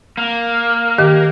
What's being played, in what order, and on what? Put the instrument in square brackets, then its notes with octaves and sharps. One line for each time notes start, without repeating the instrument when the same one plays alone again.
[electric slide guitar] A#3
[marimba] D#3 [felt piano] G4